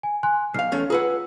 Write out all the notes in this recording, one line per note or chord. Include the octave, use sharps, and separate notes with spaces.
G#5
G#5 C6 F#6
B1 F5 F6 C7
E2 A3 C#4
F4 G#4 B4 F#5 E6